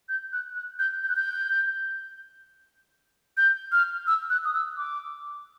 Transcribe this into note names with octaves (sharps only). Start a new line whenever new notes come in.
G6
F#6
F#6
G6
G6
F#6
G6
G6
F6
E6
F#6
D#6
E6
D6